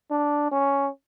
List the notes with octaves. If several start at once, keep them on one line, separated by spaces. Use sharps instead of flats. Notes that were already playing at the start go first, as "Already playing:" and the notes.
D4
C#4